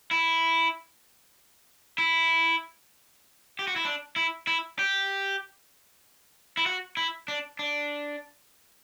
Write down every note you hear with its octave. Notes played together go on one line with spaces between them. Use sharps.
E4
E4
G4
F#4
E4
D4
E4
E4
G4
E4
F#4
E4
D4
D4